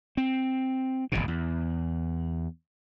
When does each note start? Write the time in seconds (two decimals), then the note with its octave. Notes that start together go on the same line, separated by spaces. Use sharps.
0.17 C4
1.12 D1 G#1 G#2 B2
1.28 E2